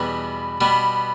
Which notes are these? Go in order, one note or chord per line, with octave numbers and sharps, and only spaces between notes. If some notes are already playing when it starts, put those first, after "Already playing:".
Already playing: E2 B2 G3 B3
B2 G3 B3